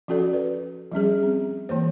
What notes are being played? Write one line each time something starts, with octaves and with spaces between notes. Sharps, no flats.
F3 C#4 F#4 A4 D5
B4
F3 G3 C#4 G#4
C4
E3 A#3 C5